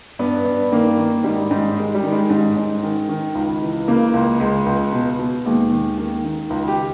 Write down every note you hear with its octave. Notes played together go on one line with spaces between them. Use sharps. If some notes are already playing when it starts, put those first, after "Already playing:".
G2 B3
G2
D#3 A#3
D#3
G#2 G3
G#2
D#3 G#3
G3
D#3
G#3
G#2
G#2
D#3
D#3
C#2
E3
C#3 A#3
C#2
C#2 G#3
C#2
B2
B2
D#2 G#3
D#2
D#3
D#3
C#2
G4